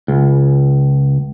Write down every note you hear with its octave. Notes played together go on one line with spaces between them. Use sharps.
C#2